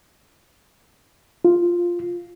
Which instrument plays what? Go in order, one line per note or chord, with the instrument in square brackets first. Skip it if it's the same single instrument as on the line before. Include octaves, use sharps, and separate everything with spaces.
[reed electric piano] F4